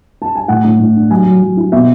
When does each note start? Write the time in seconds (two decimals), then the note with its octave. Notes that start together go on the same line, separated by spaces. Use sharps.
0.22 A5
0.36 G#5
0.48 A2 F#5
0.64 A2
0.79 A2
0.96 D4
1.10 F#3 G#5
1.26 F#3
1.42 F#3
1.57 E4
1.72 B2 E5